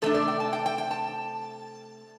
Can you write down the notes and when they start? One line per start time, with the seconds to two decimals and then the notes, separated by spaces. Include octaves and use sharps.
0.02 C3 A3 D4 A4
0.14 D5
0.28 G5
0.40 A5
0.53 G5
0.66 G5
0.78 G5
0.91 A5